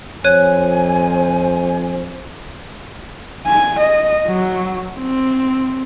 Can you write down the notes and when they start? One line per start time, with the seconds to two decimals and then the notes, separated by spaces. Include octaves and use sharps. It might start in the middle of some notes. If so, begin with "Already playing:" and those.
0.24 F2 C5 C#5 G#5 F#6 D#7
3.47 G#5
3.80 D#5
4.28 F#3
4.98 C4